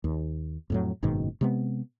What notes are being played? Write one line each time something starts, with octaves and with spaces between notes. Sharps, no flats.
D#2
F2 A2 F#3
F#1 G#2 B2 D#3
C3 G#3 B3